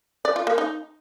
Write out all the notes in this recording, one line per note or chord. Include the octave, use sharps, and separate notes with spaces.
D5
F4
A#3
D#4